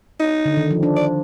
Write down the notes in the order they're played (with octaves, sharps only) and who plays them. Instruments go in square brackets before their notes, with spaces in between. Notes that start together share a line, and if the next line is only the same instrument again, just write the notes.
[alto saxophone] D#4
[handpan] D3
D#3
F3
D4
[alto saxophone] D5